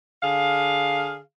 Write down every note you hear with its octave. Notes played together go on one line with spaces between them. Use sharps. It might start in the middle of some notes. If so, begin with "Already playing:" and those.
D3 G#4 F5